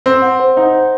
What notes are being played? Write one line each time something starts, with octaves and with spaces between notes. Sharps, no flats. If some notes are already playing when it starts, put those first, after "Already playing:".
C4 C6
F#5
C5
D#4 F#5
C5